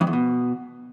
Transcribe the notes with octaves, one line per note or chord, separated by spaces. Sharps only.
F2
E2
B2